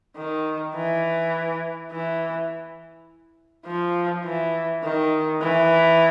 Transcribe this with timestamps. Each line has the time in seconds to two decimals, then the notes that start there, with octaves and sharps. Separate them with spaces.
0.16 D#3
0.75 E3
1.91 E3
3.66 F3
4.25 E3
4.83 D#3
5.42 E3